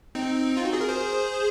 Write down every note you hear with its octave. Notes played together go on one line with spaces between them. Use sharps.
C4 D#4
F4
F#4
G#4
A#4
G#4 C5